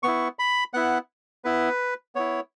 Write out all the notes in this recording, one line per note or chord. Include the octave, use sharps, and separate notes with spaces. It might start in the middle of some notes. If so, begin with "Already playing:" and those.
B3 E4 C#6
B5
B3 E4 F#5
B3 E4 B4
B3 E4 C#5